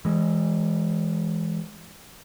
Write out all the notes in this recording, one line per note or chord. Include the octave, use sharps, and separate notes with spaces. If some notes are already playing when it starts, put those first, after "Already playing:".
E3 G#3